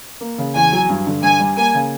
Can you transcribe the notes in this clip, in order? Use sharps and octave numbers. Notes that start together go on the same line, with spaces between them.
A#3
C#3
E2 G#5
F#3
G2
D3
G2 G#5
G3
A#3 G#5
C#3